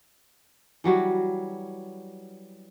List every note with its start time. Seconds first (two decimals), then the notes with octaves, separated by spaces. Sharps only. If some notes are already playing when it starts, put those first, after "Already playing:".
0.84 E3 F#3 G3 F#4